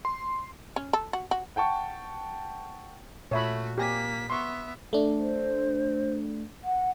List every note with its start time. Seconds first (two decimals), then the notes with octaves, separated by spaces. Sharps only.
0.05 C6
0.76 C#4
0.93 A4
1.13 F#4
1.31 F#4
1.56 F#5 G5 A5 C#6
3.31 A#2 A3 F#4 C#5 E5 B5
3.78 A#3 G4 G#5 B6
4.30 B3 E5 C6 C#6
4.93 A3 D4
5.19 C5
6.64 F#5